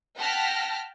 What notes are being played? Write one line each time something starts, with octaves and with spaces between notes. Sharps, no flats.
F#5 G5 A5 F6 A#6 B6